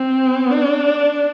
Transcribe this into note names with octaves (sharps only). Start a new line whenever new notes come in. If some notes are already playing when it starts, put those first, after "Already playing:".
Already playing: C4
D4